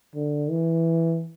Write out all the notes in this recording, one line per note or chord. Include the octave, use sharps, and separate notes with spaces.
D3
E3